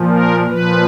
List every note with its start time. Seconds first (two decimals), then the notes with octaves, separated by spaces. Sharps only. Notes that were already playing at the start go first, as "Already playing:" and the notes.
Already playing: A#2 F3
0.10 A#4
0.47 A#2 F3 B4